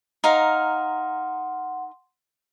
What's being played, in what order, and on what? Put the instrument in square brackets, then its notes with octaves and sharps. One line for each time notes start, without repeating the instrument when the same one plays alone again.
[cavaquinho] D#4 A#4 F5 [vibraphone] F#5 C6